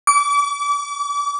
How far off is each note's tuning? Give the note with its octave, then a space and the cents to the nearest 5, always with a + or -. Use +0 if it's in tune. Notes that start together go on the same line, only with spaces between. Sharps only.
D6 -35